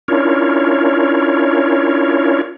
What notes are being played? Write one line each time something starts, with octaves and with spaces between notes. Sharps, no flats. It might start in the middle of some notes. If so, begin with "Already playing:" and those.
C#4 D4 E4 F4 A#4 C#5